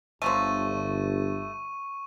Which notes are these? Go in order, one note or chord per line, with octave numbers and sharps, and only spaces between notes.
G1 F3 F#3 A3 C#6 D#7